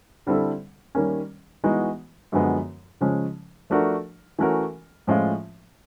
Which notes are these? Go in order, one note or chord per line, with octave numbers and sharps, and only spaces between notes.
D3 G3 C4 E4 A4
D#3 G3 A#3 C#4
E3 G#3 B3 D#4 F#4
F#2 D3 F3 G#3 B3
C#3 F3 G#3 C#4
F3 A3 D4 F#4 A#4
E3 A3 C#4 F#4 A#4
A2 F3 G#3 C#4 F4